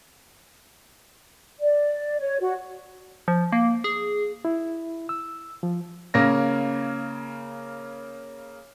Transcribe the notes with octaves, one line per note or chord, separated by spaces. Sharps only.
D5
C#5
F#4
F3
A#3
G#4
E4
E6
F3
C#3 A#3 C#5 A#6